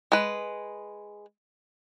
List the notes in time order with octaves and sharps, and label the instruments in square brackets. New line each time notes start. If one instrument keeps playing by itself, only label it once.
[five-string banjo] G#3 B4